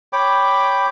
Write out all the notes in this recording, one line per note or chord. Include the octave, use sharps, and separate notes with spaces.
C#5 G5 B5 D6